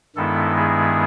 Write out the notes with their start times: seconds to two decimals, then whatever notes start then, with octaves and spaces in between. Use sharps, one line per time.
0.16 G2 D#3 G#3 B3 E4 A4
0.57 G#4